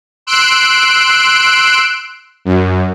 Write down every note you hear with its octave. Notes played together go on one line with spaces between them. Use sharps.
C6 E6 F#6 D7
F#2